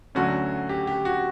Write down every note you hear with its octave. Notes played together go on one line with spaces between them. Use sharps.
D2 D3 F#3 A3 C#4 F#4
G4
G4
F#4